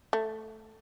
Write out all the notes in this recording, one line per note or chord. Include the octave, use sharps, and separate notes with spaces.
A3